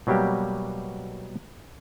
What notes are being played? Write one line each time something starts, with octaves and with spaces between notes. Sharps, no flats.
B2 F#3 G3 A#3 G4